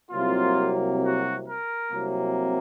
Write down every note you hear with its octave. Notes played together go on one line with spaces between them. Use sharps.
C2 C3 F#3 A#3 F4
F#4
A#4
C2 C3 F#3 A#3